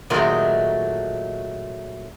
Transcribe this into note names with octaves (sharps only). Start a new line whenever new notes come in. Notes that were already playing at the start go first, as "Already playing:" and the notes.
A#2 D#3 F#3 G#3 A3 A#4